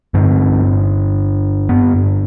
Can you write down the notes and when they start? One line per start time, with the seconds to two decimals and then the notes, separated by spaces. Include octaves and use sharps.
0.14 G2 D3 C4
1.69 B3